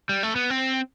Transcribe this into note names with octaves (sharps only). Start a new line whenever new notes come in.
G3
A3
B3
C4